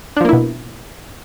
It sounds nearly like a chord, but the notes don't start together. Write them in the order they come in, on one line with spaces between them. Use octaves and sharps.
D4 F3 A#3 E4 B2